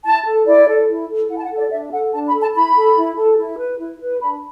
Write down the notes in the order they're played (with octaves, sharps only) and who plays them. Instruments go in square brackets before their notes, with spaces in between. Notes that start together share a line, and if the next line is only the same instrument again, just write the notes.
[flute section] E4 A5
A4
E4 D5
A4
E4
A4
E4 F#5
A5
F#5
A4
D5
D4 E5
A4 F#5
D4 A5
B5
A4
A5
E4 B5
A4
E4
A4
E4
B4
E4
B4
D4 B5